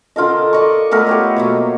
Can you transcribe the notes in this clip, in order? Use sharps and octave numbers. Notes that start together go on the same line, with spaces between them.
D3 F4 A#4 D#5
D5 D#5 C#6
A3 B3 A#4 B4
A3 G4 C#5
B2 F#3 A#3